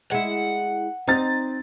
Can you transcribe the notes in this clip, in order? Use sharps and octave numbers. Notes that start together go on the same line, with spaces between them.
G#3 E4 F#5
C4 D#4 A6